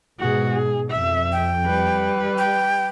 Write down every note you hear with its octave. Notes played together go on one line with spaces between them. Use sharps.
G#2 B2 F#4 G#4
G#4
F2 E5
G5
G3 B4
G5